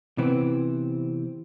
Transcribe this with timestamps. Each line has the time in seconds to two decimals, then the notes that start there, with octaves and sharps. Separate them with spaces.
0.18 C3 E3 B3 C4